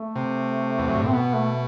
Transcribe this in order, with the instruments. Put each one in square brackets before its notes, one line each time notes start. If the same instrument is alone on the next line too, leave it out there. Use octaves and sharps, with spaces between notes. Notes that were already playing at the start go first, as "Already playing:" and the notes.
Already playing: [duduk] A3
[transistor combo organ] C3
E2
F#2
G2
A2
[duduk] C4
[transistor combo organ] B2 [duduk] B3
[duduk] A3